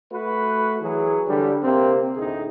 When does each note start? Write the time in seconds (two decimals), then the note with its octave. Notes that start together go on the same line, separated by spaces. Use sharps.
0.12 A3 F#4 B4
0.81 E3 F#3 G#4
1.28 D3 G3
1.63 C3 A#3 C4
2.16 D2 A2 D#4 G#4